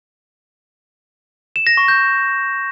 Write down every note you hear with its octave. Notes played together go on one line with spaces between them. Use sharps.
E7
A#6
C#6
G6